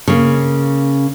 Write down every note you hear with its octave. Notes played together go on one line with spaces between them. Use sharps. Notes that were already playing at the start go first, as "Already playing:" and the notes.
C#3 A#3